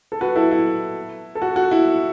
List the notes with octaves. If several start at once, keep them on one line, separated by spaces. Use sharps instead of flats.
A4
F#4 B4
E4 A4
E4
A4
F#4
F#4
E4